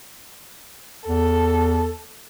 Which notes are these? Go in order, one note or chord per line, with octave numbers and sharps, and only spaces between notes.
E2 A4